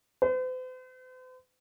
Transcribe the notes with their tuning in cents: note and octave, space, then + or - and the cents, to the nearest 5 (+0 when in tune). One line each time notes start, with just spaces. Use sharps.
C5 -45